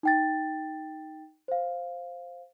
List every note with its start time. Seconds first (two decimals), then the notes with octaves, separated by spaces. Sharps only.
0.03 D#4 G5 A6
1.48 C5 F5